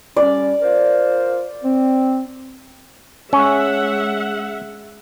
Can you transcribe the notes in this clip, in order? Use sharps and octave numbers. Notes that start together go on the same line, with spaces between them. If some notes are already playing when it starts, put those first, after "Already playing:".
G3 C#4 D5
F4 A#4 C5
C4
G#3 C#4 E5 F#5